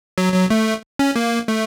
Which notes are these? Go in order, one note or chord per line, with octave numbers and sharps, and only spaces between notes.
F#3
F#3
A3
C#4
A#3
A3